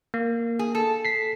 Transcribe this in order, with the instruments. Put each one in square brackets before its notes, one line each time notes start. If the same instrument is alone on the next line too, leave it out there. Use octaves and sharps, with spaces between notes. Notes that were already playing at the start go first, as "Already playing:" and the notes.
[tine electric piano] A#3
[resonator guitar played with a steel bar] G#4
A4
[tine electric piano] B6 C7